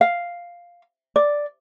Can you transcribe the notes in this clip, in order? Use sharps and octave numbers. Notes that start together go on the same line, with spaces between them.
F5
D5